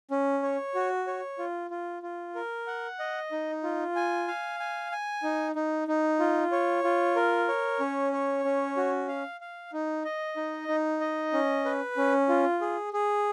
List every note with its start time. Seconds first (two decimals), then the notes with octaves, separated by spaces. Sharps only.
0.11 C#4
0.43 C#5
0.75 F#4
1.07 C#5
1.39 F4
1.71 F4
2.03 F4
2.35 A#4
2.67 F#5
2.99 D#5
3.32 D#4
3.63 F4
3.96 G#5
4.28 F5
4.60 G#5
4.92 G#5
5.23 D#4
5.55 D#4
5.88 D#4
6.20 F4
6.52 C#5
6.84 F4
7.16 A#4
7.48 C#5
7.80 C#4
8.12 C#5
8.45 C#4
8.77 F#4
9.08 F5
9.41 F5
9.73 D#4
10.05 D#5
10.36 D#4
10.68 D#4
11.01 D#5
11.33 C#4
11.65 B4
11.97 C#4
12.29 F4
12.61 G#4
12.93 G#4